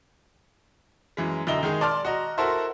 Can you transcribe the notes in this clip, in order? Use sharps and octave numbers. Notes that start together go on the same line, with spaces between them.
F#2 E3 G#3
B1 D3 E4 D#5 A#5 G7
D#3 G#3 D#4 G#4
D5 A5 C6 D6 F6
F#4 D#5 A#5
E4 F#4 A4 A#4 C5 E5